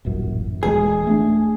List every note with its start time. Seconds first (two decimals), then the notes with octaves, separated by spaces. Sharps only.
0.05 D#1 A1 F#2
0.63 D#1 E3 G#3 G#4
1.07 A3 C4 D4